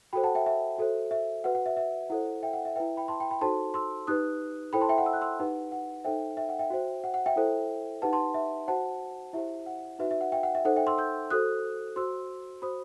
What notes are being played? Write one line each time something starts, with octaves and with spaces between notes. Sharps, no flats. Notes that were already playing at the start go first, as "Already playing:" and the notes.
F#4 A4 C5 G5 B5
F#5 A5
E5 G5
E5
F#4 A4 C5
E5
F#4 B4 F#5
F#5
E5
E5
E4 A4 C5 F#5
E5 G5
F#5
E5
E4 B4 E5 G5
G5 B5
A5 C6
G5 B5
G5 B5
D#4 F#4 A4 C5 A5 C6
C6 E6
D#4 G4 B4 D#6 F#6
E4 A4 C5 G5 B5
A5 C6
E5 G5
F#5
E6
F#6
C6 E6
D#4 G4 B4 F#5
F#5
D#4 A4 C5 E5 G5
E5 G5
F#5
E5 G5
F#4 C5
F#5
F#5
E5 G5
E4 A4 C5
D#4 G4 B4 F#5 A5
A5 C6
E5
F#4 C5 F#5 A5
E4 G4 C5 E5
F#5
D#4 F#4 B4 E5
E5
F#5
E5 G5
F#5
E5
D#4 A4 C5 F#5
E5 G5
C6 E6
E6 G6
F#4 A4 C5 D#6 F#6
F#4 C5 C6 E6
F#4 C5 B5 D#6